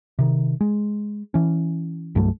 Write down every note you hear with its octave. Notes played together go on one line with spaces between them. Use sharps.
C3 D#3
G#3
E3 C#4
C2 G2 F#3 A3